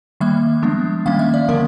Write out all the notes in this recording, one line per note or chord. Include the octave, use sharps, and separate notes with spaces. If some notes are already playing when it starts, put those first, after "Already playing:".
D#3 G3 A#3 E5
F3 G#3 B3 D4
D#3 G3 A#3 C#4 F5
E5
D5
D3 F3 A#3 C#4 A#4